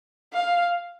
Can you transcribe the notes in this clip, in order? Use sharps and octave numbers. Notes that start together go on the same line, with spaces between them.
F5